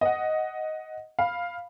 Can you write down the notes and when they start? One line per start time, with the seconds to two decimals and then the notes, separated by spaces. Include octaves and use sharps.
0.01 D#5 F#5
1.19 F5 B5